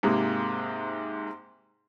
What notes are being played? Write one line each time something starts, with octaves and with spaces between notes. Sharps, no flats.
G#2 C3 G#3 A#3 G#4